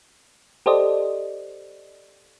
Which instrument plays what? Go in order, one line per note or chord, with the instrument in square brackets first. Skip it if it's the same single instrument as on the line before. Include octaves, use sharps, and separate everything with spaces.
[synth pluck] G4 A4 C5 D5 D#5